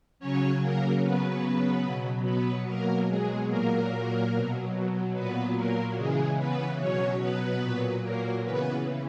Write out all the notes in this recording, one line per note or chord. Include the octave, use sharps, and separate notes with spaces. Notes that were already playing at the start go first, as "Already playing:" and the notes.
C#3 F#3 C#4 C#5
A#3 A#4
C#3 F#3 B3 B4
B2 F#3
B3 B4
B2 F#3 A#3 A#4
G#3 G#4
A#2 F#3 A#3 A#4
B2 F#3
A#2 F#3 B3 B4
A#3 A#4
C#3 E3 G#3 G#4
B3 B4
B2 F#3 C#4 C#5
B3 B4
A#2 F#3
A#3 A#4
C#3 E3 B3 B4